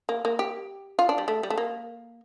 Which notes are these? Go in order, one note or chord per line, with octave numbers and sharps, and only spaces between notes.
A#3
A#3
G4
F4
D4
G3
A3
G3
A3
A#3